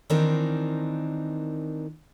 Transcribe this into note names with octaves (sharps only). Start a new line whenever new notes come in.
D#3 E3 C4 D4 D#4 A#4